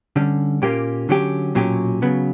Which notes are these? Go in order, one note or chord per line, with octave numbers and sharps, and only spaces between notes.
D3 G3 C#4
A#2 A#3 C#4 G4
D3 F#3 C#4 G4
B1 A#2 F#3 C#4 G4
C#3 F#3 B3